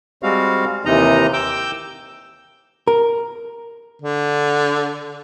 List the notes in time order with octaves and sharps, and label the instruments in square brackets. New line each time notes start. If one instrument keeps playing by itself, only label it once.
[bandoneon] G3 G#3 C4 F#4 F5
D#2 C3 E3 D#4 D#5 A#5
G5 D6 E6 G6
[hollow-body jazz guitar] A#4
[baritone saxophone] D3